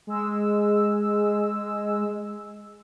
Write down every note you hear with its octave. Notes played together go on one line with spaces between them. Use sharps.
G#3 E6